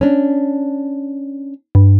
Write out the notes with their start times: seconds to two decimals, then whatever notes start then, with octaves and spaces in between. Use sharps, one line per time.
0.01 C#4 D4
1.75 G2